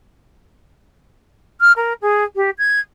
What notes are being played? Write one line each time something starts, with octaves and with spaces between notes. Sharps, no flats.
F6
A#4
G#4
G4
G#6